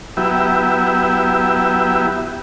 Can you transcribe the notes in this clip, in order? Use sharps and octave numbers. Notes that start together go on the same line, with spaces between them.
F#3 B3 E4 G4 E5